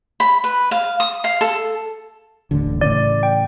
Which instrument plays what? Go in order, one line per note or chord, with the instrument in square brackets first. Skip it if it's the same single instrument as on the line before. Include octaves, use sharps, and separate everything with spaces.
[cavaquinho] B5
B4
F5
D#6
F5
A4
[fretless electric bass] D#1 A1 D3
[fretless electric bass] A2 C#3 E3 [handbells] D5
[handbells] G5